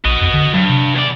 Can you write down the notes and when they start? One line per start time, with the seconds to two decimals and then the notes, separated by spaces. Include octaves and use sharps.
0.05 A#1 F#4 D#5
0.21 F2
0.34 D3
0.53 G2 F#3
0.69 C3
0.96 E2 D5